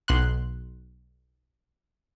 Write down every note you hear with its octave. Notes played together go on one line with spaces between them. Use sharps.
B1 C6 F#6